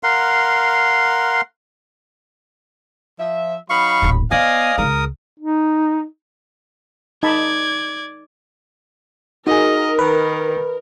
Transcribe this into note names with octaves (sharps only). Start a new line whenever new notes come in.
A#4 F5 F#5 C6
F3 E5
F#3 D#4 F5 B5 C#6
D#1 A1
B3 C5 D5 D#5 F5 G#5 D#6
C#2 G#3 A#4 D#6
D#4
D#4 D5 A5 B5 G#6
D#4 F#4 G#4 A#4 D#5
D#3 B4